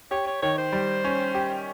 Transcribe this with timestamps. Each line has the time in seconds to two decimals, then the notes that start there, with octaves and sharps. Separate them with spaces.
0.11 G4 C#5
0.27 C#5
0.42 D#3 C#5
0.58 C5
0.73 G3
1.04 C#4
1.35 G4